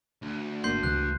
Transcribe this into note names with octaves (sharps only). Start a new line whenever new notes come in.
D2
G#1 A#3 D4 C6 G6 C7
C#2 C3 E3 F#6